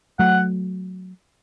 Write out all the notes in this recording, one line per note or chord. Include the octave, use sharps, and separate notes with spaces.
F#3 A3 F#5